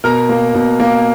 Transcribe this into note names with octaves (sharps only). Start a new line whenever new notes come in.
B2 A#4 A#5
A#3
B2
A#3